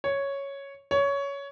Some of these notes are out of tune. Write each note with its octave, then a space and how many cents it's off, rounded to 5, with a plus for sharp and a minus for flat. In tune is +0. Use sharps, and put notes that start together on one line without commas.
C#5 +0
C#5 +15